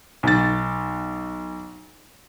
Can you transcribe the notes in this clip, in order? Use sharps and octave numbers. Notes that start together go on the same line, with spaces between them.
B1 A6